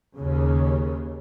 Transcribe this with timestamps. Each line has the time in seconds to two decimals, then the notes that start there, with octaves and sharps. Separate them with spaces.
0.17 D#2 C#3